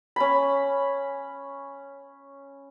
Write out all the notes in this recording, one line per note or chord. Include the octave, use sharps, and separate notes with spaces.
C#4 B5